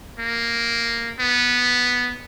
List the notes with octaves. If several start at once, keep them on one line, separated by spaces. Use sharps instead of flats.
A#3
B3